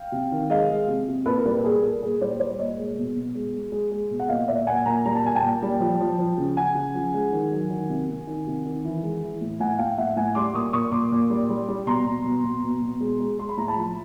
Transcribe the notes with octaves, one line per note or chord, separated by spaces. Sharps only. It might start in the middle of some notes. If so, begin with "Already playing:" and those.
Already playing: F5 G5
C3
D#3
G#3 D#5 F5
G#3
C3
C3
A#2 A4 B4
A#4
G3 A4 B4
A4
A#2 G#4 A#4
A#2 A4
A#2 G#4
G3 C5 D5
G3 C5 D5
A#2 C#5 D#5
G#3
B2
B2
G#3
G#3
G#3
G#3
B2
F#5
A#2 D#5 F5
A#2 D5 E5
A#2 F#5 G#5
A#2 G#5 A#5
G3 A#5
A5
A#2 G#5
G5 A5
A#2
G3
F3
F3
F3
C#3
C#3 F#5 G#5
C#3
F3
G#3
D#3
F#3
D#3
C3
C3
D#3
C3
D#3
E3
G#3
E3
A2
A2 F#5 G#5
A2 F5 G5
A2 E5 F#5
A2 F#5 G#5
G3 C6 D6
A#2 C#6 D#6
A#2 C#6 D#6
A#2 C6 D6
A#2
G3
G3
G3
B2 A#5 C6
B2
B2
B2
B2
B2
G#3
G#3
G#3 C6
B5
A2 A#5
A5 B5
F3